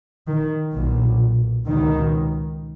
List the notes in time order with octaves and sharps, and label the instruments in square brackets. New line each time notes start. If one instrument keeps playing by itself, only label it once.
[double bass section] D#3
B1 A#2
C#2 B2 D#3